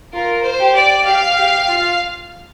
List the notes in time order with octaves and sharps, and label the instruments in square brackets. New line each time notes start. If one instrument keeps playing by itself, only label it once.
[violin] F4 [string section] A#4
[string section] C5
[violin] G4
[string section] D5
[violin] G4 [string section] F5
[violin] G4
F4